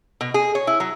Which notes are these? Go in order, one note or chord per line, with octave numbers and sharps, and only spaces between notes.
B2
G#4
C#5
E4
F#3